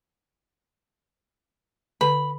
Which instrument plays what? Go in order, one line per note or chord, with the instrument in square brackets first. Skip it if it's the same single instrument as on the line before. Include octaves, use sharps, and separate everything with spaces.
[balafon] D3 B4 [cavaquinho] B5